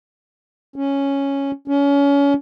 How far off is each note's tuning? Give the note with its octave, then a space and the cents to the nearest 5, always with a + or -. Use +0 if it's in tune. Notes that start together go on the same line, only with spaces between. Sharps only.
C#4 +0
C#4 +30